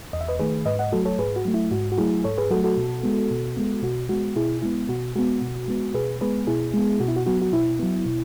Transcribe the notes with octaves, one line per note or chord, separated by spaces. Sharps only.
E2 D#5
E5
B4 D#5
D#3 A3 G#4 B4
G#2 B4 D#5
D#5 F#5
F#3 A3 F#4 A4
A4 C#5
G#2 G#4 B4
F#4
F#3 A3
E4
G#2 F#4
F#4
F#3 A3 E4 G#4
G#2 A4 C#5
G#4 B4
F#3 A3 F#4 A4
F#4 A4
B2
G#3 B3
B2
G#3 B3
B2 F#4
G#3 B3 F#4
B2 E4 G#4
G#3 B3 E4
B2 F#4
G#3 B3 F#4
B2
G#3 B3
B2 G#4 B4
G#3 B3 G#4 B4
B2 E4 G#4
G#3 B3
B2 F#4
E4
F#4
F#3 B3 F#4
F#4
B2 E4
F#3 B3
B2